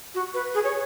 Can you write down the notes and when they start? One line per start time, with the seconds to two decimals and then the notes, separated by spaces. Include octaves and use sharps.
0.15 F#4
0.34 B4
0.55 G#4
0.64 C#5